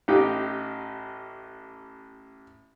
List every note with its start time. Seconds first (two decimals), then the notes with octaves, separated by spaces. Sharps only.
0.08 A1 D#4 G4 G5